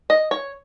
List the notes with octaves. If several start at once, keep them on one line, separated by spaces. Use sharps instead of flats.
D#5
C#5